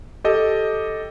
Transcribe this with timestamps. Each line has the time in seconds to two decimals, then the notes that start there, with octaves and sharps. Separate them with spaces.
0.24 G4 A4 D#5